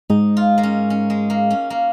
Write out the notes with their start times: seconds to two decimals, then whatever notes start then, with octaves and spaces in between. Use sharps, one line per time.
0.10 G#2 D#4
0.37 F4
0.58 A#3
0.63 C#4
0.90 C#4
1.10 G#3
1.30 A#3
1.50 C#4
1.70 A#3